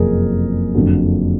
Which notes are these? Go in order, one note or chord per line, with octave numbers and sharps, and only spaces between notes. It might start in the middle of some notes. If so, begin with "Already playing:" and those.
Already playing: F#1 F2 C3 G#4 A#4
F#1 F2 D3 F#3